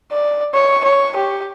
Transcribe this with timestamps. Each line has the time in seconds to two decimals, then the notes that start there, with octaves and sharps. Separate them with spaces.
0.11 D5
0.54 C#5
0.84 C#5
1.16 G4